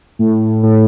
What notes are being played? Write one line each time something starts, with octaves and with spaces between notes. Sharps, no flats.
A2
A2